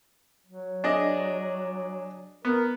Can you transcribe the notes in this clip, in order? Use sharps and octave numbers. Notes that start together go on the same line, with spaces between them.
F#3
D4 G#4 D#5
B3 A#4